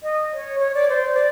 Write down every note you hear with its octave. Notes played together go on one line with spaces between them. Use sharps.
D#5
C#5
C#5
D5
C5
D5